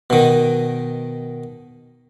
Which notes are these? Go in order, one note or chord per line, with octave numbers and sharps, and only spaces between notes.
B2 D#3